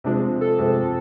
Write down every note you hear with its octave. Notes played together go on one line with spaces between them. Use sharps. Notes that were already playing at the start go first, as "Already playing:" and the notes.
C3 F3 G#3 C4 D4
A4
C3 F3 G#3 C4